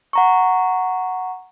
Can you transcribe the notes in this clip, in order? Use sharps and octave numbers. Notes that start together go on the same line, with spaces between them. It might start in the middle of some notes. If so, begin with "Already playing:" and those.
F#5 A#5 C#6